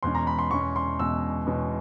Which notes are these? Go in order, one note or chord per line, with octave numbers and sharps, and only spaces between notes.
E2 B2 G#3 C#4 C6
A#5
B5
C6
E2 B2 G#3 C#4 C#6
C6
E2 B2 G#3 C#4 E6
E2 B2 G#3 C#4